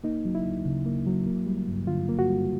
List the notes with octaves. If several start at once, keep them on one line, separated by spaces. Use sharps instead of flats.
A#3 D#4
F#3
E4
D2
C#3
A#3
F#3
A#3
G3
G2
D3 F4
A#3
F#4
G3